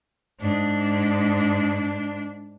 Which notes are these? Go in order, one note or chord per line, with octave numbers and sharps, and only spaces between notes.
G#2 D4